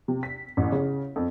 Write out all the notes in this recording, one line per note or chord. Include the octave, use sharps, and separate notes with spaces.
C3
B6
A1
C#3
F2